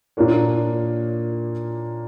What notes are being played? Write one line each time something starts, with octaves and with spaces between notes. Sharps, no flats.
A#2 A#3 D4 A#4 C#5